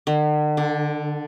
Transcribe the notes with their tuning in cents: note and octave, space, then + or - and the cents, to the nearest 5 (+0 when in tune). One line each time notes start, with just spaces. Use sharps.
D3 +45
D3 +0